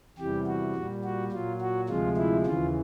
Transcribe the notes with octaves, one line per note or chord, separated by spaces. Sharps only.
E2 C3 E3 G3 G4
F#4
A#2 G3
F#4
A#2 F#3 F4
F#4
D2 C3 F3 G#3 F4
E4
D#2 C#3 E3 F4